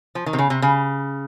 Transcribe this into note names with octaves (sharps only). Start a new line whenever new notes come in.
F3
D#3
C3
C#3
C3
C#3